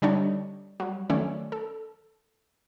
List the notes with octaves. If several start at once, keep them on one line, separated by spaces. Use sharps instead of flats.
D3 G3 D4 D#4 C#5
F#3 G3
D#3 F#3 A3 C#4 D5
A4